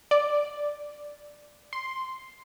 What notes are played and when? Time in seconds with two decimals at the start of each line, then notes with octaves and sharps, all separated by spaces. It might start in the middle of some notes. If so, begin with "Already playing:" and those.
0.11 D5
1.73 C6